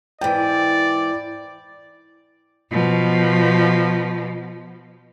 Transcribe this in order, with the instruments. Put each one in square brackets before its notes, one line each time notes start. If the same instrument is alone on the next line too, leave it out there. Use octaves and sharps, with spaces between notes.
[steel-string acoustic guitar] G#2 E3 [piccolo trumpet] D5 [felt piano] G5
[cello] B2 F3